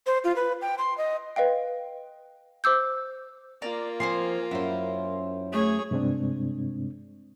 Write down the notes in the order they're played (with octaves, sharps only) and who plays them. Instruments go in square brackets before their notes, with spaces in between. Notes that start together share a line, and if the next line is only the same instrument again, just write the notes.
[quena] C5
F4
B4
G5
C6
D#5
[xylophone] B4 D#5 F5 G5
C5 D6 E6 G6
[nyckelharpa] A#3 F4 [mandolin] D5 A#5
[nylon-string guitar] F3 C4 [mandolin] C5 G#5 C6
[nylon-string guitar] F#2 C#4 [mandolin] E4 C5
[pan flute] A3 [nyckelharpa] G#4 C#5
[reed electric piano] G2 C3 G#3 C4 D4